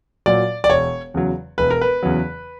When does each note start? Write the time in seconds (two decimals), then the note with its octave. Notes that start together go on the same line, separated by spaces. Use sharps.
0.26 A#2 F#3 D5
0.64 D5
0.70 E1 C#5
1.14 E2 C#3 F#3
1.58 E1 B4
1.70 A#4
1.81 B4
2.03 E2 C#3 F#3